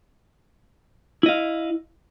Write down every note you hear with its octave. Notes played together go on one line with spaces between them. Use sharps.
E4 D#5 F5